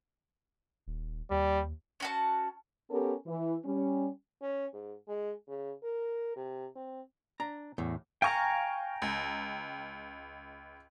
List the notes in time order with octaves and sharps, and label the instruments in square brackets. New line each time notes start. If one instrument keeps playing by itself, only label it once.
[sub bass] D#1
[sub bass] D#2 [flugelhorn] G3
[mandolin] C#4 F#4 A5
[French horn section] B3 C#4 G4 A4 A#4
E3
G3 C#4
[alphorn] C#4
G#2
G#3
C#3
A#4
C3
C4
[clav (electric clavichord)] D4 [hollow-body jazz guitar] A#5
[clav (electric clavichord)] E2 [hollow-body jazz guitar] A2
[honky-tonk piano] F5 C#6 [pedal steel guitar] G5 G#5 A#5
[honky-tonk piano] C#2